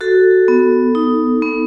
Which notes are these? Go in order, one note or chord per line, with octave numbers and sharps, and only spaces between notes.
F#4 A4
B3
D#4
B3